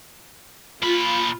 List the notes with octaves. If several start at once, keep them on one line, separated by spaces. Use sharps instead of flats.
A#2 F4 B5